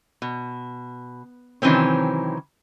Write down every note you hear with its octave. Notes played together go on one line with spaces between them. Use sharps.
B2
C3 D#3 E3 F#3 C4 C#4